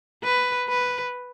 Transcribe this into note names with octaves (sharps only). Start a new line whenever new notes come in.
B4
B4